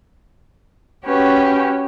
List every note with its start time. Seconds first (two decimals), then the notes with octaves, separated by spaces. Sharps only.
1.05 C#4 F#4 G4 B4